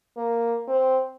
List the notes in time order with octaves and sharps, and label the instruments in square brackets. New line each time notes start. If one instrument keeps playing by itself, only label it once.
[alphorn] A#3
C4